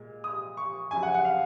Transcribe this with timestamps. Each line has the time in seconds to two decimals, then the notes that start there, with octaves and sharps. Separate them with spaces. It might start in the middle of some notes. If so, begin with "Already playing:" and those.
Already playing: A#2 G#3
0.24 D#6
0.57 C#6
0.91 F2 C#3 F#3 G#5
1.03 F#5
1.14 F#5
1.25 F5